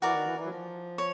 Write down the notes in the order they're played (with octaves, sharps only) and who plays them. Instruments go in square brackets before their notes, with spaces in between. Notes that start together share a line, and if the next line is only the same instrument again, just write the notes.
[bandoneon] E3 [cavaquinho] F#4 A#4 D5
[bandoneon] D#3
E3
E3
F#3
F3
[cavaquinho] C#5